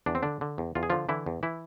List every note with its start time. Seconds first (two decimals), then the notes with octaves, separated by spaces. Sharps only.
0.06 E2 D4
0.15 C4
0.23 D3 D4
0.41 D3
0.58 E2
0.75 E2 F4
0.83 G#4
0.90 D3 F3 F4
1.09 D3 E3 E4
1.26 E2
1.43 E3 E4